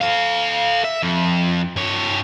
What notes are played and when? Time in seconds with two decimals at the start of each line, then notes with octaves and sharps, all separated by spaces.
0.01 A4 F5
0.85 E5
1.03 F2
1.76 G2 C#5